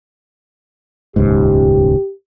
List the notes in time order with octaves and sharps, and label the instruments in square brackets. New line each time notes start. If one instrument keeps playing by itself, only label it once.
[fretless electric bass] D#1 C#2 G#2 [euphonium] G4